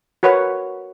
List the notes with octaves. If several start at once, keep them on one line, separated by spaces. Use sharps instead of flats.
F#4 A#4 B4 C#5 F#5